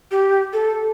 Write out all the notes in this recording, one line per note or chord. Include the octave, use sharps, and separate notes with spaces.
G4
A4